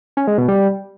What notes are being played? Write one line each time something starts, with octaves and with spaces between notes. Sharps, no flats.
C#4
G#3
B2
G3